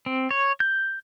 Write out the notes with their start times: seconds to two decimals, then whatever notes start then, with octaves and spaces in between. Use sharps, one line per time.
0.06 C4
0.31 C#5
0.60 G6